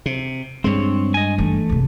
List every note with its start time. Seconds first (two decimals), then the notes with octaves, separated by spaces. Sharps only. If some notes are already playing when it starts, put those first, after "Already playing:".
0.06 C3
0.64 G2 G#3 C4 C#5
1.14 D#5 G#5
1.38 E3 A3 D#4
1.69 F#1 C3